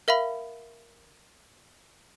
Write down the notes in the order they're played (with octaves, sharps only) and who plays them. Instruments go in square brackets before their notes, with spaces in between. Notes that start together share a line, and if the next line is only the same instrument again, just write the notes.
[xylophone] A#4 E5 F5 B5